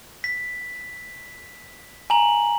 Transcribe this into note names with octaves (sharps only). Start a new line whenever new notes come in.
B6
G#5 A#5 F#7